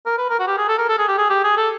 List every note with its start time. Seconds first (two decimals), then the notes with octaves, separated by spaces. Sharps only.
0.06 A#4
0.18 B4
0.30 A#4
0.39 F#4
0.47 G4
0.58 G#4
0.68 A4
0.78 A#4
0.89 A4
0.99 G#4
1.08 G4
1.18 G#4
1.30 G4
1.44 G#4
1.57 A4